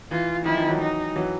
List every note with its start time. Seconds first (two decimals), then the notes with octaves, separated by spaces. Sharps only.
0.11 E3 F4
0.45 D#3 F3 E4
0.57 D#3 F3
0.68 E3 F#3
0.81 D#4
1.16 E3 F#3